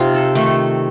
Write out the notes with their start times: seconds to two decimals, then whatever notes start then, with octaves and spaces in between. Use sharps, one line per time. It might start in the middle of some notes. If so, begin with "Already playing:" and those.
Already playing: C3 D#4 F4
0.15 A4
0.35 D#3 A3